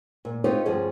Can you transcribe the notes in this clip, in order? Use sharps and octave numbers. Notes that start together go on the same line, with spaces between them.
A#2
C4 D#4 F4 G4 B4 C#5
D2 G2 F3 C#4 G#4